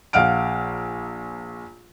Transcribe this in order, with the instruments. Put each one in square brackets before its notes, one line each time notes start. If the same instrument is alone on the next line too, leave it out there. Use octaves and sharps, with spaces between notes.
[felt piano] A#1 F5 F#5 F6 D7